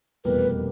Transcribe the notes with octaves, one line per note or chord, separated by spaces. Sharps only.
F1 E2 B2 G3 A#3 B4